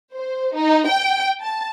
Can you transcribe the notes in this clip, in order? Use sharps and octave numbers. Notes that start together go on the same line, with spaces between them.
C5
D#4
G5
A5